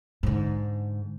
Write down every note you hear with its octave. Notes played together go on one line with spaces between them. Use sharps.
G#2 D3